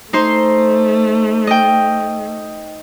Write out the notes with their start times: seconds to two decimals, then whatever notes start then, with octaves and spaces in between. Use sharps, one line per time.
0.13 A3 D#4 C5 C6
1.47 D#5 G5